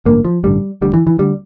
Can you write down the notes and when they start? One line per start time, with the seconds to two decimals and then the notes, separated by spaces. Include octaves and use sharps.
0.05 A1 G2 D3 A#3
0.25 F3
0.44 A1 G2 D3 G3
0.82 E1 D2 D3 G3
0.94 E3
1.07 E3
1.19 D2 D3 G3